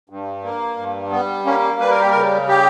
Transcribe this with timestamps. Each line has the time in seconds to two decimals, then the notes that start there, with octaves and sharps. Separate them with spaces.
0.10 G2
0.44 A#3
0.77 G2
1.11 G3 B3
1.45 A#3 C#4
1.80 G3 B4
1.90 A#4
2.00 G4
2.10 C#3 A#4
2.48 G4